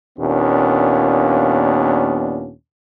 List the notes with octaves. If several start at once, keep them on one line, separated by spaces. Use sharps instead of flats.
D#2 A#2 B3 C#4 D4